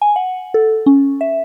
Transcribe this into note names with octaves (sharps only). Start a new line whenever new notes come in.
G#5
F#5
A4
C#4
E5